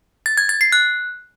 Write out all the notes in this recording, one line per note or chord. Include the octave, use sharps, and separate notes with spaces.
A6
G#6
A6
C7
F#6